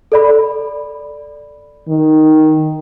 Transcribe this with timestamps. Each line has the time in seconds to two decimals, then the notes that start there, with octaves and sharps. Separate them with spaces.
0.12 A4 D5 B5
1.88 D#3